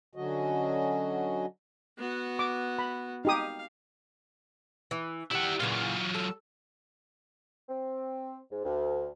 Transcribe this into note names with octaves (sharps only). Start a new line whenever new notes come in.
D3 F#3 C#4 F#4 D#5
B3 F#4
D6
B5
D#4 G4 F5 D#6
E3
D#3 G3 E4 F#5
A#2 C#3 E3 F#3 F4
A4
C4
G#2
D2